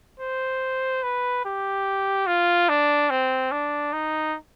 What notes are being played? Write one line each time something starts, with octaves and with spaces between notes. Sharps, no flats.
C5
B4
G4
F4
D4
C4
D4
D#4